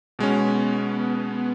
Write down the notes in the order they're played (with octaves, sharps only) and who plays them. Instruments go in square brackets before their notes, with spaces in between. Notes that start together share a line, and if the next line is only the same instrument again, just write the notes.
[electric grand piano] B2 G#3 C#4 [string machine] B3